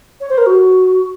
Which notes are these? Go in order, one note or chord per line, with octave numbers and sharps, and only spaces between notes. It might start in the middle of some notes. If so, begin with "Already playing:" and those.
C#5
C5
A#4
F#4